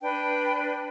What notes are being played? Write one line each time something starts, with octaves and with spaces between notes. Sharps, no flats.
D4 B4 G5